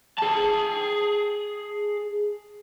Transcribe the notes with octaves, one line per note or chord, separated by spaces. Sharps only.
G#4 A5